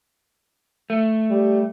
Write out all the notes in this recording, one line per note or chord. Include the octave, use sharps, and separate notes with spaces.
A3
G3